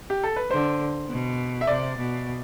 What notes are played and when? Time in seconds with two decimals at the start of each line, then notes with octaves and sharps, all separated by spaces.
0.10 G4
0.23 A4
0.36 B4
0.50 D3 C5
1.09 B2
1.61 E5
1.67 C3 D5
1.98 B2